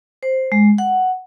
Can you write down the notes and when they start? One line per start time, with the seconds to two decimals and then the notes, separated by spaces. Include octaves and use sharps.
0.23 C5
0.52 G#3
0.78 F#5